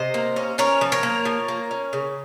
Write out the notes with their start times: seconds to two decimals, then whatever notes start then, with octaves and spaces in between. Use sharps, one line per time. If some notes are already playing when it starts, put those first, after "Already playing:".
Already playing: C3 C5 D#5
0.14 A#3
0.36 C#4
0.58 C#4 A#4 C#5
0.81 F3
0.92 A#4 C#5
1.03 A#3
1.25 F3
1.48 A#3
1.71 C#4
1.93 C#3